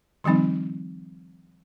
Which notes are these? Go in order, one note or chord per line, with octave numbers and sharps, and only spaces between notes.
D#3 F3 G3 C4 D#4